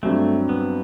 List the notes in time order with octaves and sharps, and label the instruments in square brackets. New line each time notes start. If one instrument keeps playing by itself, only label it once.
[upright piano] G2 F#3 C4 [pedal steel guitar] A3
[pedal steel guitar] B3